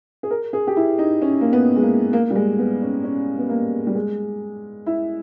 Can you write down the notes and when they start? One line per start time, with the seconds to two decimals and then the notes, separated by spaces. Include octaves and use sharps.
0.23 G#4
0.31 A#4
0.53 G#4
0.67 G4
0.77 E4
0.99 D#4
1.22 C#4
1.41 A#3
1.53 B3
1.76 G#3
1.82 A#3
2.13 A#3
2.30 G3
2.36 G#3
2.59 B3
2.82 C#4
3.04 C#4
3.38 B3
3.50 A#3
3.87 G3
3.95 G#3
4.86 E4